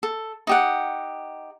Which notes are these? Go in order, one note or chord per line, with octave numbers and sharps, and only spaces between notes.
A4
D#4 G4 F#5